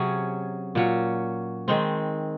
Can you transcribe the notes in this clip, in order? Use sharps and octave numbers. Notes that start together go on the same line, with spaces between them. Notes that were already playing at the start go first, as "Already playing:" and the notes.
Already playing: C3 F#3 C#4 G#4
A#2 F#3 C#4
D#3 G#3 C4